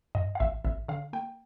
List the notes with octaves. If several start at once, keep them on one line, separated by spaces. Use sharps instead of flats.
G2 D#5
F5
A1 E5
A1 E5
D3 F5
A#3 G5